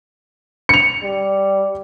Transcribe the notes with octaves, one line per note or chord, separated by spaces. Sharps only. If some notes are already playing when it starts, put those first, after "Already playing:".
C#7 F7
G3